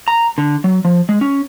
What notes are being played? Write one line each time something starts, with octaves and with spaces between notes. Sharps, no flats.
A#5
D3
F#3
F3
G#3
C#4